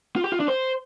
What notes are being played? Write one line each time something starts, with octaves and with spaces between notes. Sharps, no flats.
F4
G4
F4
D4
C5